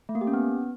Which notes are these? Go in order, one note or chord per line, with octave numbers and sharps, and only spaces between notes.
A3
A#3
G4
C#4
B3